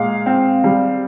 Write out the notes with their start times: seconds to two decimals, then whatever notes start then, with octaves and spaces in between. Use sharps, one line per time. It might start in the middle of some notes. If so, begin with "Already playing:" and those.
Already playing: A#2 G#3 F5
0.26 C4
0.64 G3